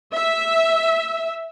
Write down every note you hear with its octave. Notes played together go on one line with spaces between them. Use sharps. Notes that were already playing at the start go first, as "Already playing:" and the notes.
E5